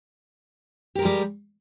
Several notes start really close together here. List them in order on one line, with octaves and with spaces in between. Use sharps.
G4 A#4 G#3 G3